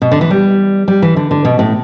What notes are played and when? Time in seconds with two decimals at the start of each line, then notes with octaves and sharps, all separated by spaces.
0.02 B2
0.11 D3
0.21 E3
0.31 G3
0.88 G3
1.02 E3
1.16 D3
1.31 D3
1.45 B2
1.59 A2